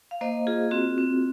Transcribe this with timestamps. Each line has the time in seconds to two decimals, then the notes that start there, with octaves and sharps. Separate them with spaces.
0.11 F5
0.21 A#3 C5 D#5
0.47 F4 G#4
0.71 C4 F#4
0.98 C4